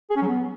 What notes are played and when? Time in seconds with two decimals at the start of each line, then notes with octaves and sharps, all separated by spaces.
0.10 G#4
0.16 C#4
0.22 F#3
0.28 B3